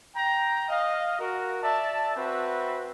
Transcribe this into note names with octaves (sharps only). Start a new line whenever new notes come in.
G5 A#5
D#5 F5
F#4 A#4
D5 E5 A5
C4 F#4 B4 E5